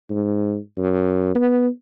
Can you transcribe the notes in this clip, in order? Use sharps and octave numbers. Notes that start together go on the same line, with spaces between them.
G#2
F#2
B3